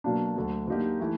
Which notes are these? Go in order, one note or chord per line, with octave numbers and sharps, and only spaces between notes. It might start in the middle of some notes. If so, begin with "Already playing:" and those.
B2 F#3 A#3 D4
D2 D3 F#3
D3 F#3 A#3 D#4 G4
E3 A3